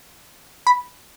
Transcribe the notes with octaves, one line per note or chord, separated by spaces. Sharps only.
B5